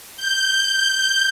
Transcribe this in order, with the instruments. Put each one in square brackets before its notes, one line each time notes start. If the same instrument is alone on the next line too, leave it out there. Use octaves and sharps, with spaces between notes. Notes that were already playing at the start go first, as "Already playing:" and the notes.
[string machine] G6